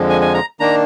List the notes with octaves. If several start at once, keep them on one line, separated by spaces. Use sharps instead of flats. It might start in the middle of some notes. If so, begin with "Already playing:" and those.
Already playing: F2 D3 F3 G#3
G#5
G#5
A#5
D#3 A#3 D4 A#5